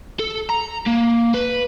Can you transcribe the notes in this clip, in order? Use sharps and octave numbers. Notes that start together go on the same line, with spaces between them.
A4
A#5
A#3
B4